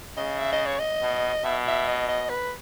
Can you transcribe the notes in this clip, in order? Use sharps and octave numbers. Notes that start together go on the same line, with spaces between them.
C#3 D#5
E5
D#5
C#5
D#5
B2
B2 E5
E5
D#5
D#5
B4